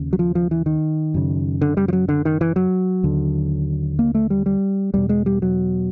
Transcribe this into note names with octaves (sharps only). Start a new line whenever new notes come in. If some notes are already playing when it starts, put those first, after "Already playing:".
Already playing: D#2 C#3
F#3
F3
F3
E3
D#3
F#2 C#3
D3
G3
F3
F#3
D3
D#3
E3
F#3
D#2 D3
A#3
A3
G3
G3
E2 B2 G3
G#3
G3
F#3